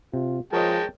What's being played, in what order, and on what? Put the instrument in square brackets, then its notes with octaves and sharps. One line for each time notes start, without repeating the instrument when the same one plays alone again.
[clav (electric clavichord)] C3 [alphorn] F4
[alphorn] F3 [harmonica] G#3 G5 A5 [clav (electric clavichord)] A#4 C#5 D#5